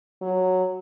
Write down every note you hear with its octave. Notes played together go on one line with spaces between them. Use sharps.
F#3